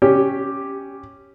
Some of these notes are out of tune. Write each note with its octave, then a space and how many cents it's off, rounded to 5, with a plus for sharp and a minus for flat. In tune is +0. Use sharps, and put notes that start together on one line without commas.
C#4 +0 G4 +0